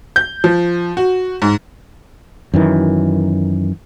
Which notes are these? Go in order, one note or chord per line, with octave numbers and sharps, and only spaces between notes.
G6
F3
F#4
G#2
F#2 D#3 E3